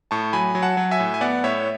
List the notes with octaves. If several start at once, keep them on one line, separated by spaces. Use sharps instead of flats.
A2 A5 C#6
F#3 G#5 B5
F#3
F#5 A5
F#3
E5 G#5
A2
G#5
B3 D5 F#5
A2 C#5 E5